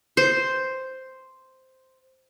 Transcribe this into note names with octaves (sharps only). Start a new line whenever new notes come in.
C5